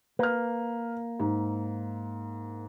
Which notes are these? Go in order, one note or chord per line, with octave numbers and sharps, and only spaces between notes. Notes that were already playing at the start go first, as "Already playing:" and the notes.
A#3 B4 F6
G#2